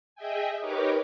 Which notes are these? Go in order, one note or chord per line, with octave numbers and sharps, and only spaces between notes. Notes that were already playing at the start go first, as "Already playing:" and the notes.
G#4 D#5 E5 G5 G#5
D#4 G4 A#4 B4 C#5 D6